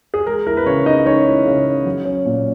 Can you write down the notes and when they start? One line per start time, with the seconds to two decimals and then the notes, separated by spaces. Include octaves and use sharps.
0.14 G#4
0.26 G#3 A#4
0.46 E4 A#4
0.57 B4
0.66 C#3 C#4 C#5
0.86 C#4 D#4 D#5
1.06 G#3 C#4 C#5
1.26 E4
1.45 C#3
1.65 C#4
1.86 F#3
2.05 C#4
2.25 A#2